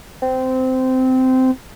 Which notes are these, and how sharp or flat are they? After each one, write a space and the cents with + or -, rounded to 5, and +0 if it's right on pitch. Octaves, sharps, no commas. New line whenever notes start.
C4 -15